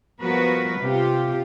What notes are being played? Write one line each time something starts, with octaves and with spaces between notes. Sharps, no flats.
F3 G3 B3 F#4 A#4 B4
C3 F4 G4